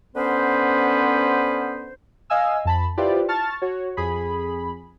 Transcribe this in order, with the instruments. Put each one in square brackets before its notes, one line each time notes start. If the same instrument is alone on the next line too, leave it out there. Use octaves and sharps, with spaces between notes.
[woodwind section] D3 B3 C#4 B4 C5
[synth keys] D#5 F5 G#5 E6
F2 A5 B5
E4 F4 G4 B4 C5 D5
A5 C#6 F6 A6
F#4 C#5
F2 G#4 B5